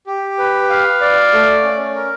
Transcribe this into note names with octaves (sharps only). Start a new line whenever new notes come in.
G4
B4
F5
D5
A3
C#4
A#4